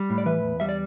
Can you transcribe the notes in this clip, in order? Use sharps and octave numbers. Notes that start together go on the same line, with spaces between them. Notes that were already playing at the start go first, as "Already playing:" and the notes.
Already playing: G3
A2
D5
E3 B4 E5
E2
G3 E5
D5